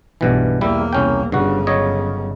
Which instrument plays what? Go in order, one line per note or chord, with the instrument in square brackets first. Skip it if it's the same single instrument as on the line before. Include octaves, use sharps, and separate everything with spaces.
[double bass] B1 [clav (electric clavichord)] G2 B2 E3
[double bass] E2 A#3 [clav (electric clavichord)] G3 E4
[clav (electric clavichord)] C2 C#4 G5
[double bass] G1 C#3 [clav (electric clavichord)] G2 F#4
[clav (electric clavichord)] F#3 C#5 D#5